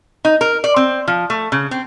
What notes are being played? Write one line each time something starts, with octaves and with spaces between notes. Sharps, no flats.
D#4
A#4
D5
C4
F3
A3
C#3
C4